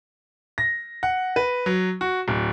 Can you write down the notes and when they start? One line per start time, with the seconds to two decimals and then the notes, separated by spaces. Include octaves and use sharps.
0.58 A#6
1.03 F#5
1.36 B4
1.66 F#3
2.01 F#4
2.28 D1